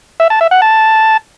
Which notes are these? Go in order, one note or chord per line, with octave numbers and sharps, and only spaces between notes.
E5
A5
E5
F#5
A5